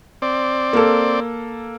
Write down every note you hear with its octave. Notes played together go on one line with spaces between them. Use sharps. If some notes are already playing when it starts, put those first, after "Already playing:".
C4 D5
A#3 A4